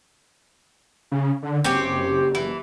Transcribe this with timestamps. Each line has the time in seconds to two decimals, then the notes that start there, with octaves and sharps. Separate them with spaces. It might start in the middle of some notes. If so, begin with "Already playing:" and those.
1.12 C#3
1.43 D3
1.64 F#1 C4 C#4 G4
2.35 E3